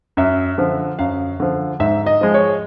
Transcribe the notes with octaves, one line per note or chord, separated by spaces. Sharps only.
F#2 E5
D3 F3
F#2 F5
D3 F3
G#2 E5
D#5
F3 G#3
C#5